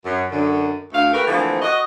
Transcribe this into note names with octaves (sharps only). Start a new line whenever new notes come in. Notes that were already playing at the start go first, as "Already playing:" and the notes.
F#2
F#2 D3
D2 A3 F5
A3 F#4 G4 A#4 B4
D3 E3 F3 A3 A#3 C4
F#4 D#5